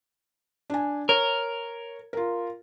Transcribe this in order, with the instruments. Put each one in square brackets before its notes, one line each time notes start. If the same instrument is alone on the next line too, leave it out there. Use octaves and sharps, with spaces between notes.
[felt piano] D4 G#5
[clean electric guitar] A#4 [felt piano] C#5
[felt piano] F4 A#4